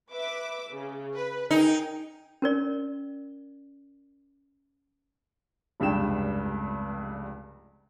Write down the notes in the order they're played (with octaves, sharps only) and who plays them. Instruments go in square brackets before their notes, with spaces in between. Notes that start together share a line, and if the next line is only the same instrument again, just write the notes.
[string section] B4 E5 D6
C#3
B4
[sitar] D#4 [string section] G#4 A#4 G5
[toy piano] C#4 A#4 D5
[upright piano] F1 C#2 G2 G5 E7